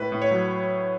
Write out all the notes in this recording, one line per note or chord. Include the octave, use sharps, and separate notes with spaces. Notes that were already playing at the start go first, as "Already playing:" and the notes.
Already playing: A2 B4
A2
C#5
F#3